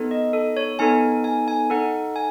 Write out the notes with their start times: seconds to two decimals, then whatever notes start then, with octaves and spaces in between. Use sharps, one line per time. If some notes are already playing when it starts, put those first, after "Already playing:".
Already playing: B3 D#4 A4
0.11 D#5
0.33 A4
0.57 C#5
0.79 B3 D#4 A4 G#5
1.24 G#5
1.48 G#5
1.70 D#4 A4 F#5
2.16 G#5